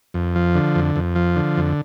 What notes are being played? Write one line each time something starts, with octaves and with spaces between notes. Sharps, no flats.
F2
F3
D3
F2
F2
F3
D3
F2